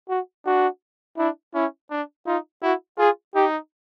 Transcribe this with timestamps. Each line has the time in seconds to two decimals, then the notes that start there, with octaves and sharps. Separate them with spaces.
0.09 F#4
0.46 D4 F#4
1.17 D4 E4
1.54 C#4 E4
1.91 D4
2.26 D#4 F4
2.62 E4 F#4
2.98 F4 G#4
3.35 D#4 G4